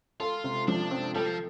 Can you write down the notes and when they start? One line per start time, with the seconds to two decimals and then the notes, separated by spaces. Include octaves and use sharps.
0.20 F4 A4
0.44 C3
0.68 F3 D4
0.91 C4
1.15 G3 A4
1.26 F3